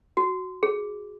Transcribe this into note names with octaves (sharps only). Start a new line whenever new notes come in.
F#4
G#4